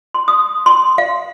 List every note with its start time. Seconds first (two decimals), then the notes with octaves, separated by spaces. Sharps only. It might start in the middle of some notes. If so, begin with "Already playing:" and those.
0.14 C6
0.28 D#6
0.66 C6
0.98 F5